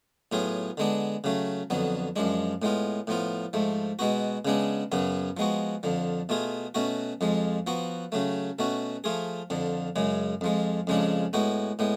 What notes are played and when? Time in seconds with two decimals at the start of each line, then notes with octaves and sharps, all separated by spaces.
0.32 A2 F#3 B3 F4 G#4
0.77 D3 G#3 B3 D4
1.24 C#3 F#3 A3
1.70 F2 D3 F#3 B3
2.16 F#2 F3 G#3 D4
2.62 A2 G#3 B3 F4
3.07 A2 F3 B3 F4
3.53 G#2 F3 A3
3.99 B2 G#3 B3 F#4
4.45 C#3 G#3 B3 D4
4.92 F#2 C#3 F#3 B3
5.37 F3 G#3 B3 F#4
5.83 F2 D3 F3
6.29 B2 A3 F4 G#4
6.75 B2 A3 C#4 F#4
7.21 F2 F3 G#3
7.67 F3 B3 F#4
8.12 C#3 F#3 A3
8.59 B2 A3 C#4 F#4
9.04 F3 A3 F4 G#4
9.50 F2 D3 F3
9.96 F#2 C#3 G#3
10.41 F2 F3 G#3
10.87 F2 C#3 F3 G#3 D4
11.33 A2 G#3 B3 F#4
11.79 A2 G#3 B3